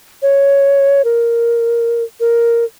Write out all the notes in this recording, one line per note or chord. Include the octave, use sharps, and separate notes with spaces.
C#5
A#4
A#4